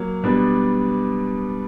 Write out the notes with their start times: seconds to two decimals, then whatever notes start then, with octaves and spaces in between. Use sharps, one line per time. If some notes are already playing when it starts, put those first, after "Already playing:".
Already playing: F#3 A#3
0.23 B2 G3 B3 D4